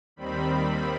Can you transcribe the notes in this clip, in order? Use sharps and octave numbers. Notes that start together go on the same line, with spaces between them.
D#2 D#3 G3 C4 B5